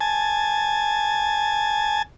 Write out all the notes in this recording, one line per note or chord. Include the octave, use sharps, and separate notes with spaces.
G#5 A5